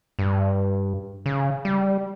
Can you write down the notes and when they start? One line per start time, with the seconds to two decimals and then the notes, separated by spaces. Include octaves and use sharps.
0.19 G2
1.26 C#3
1.65 G3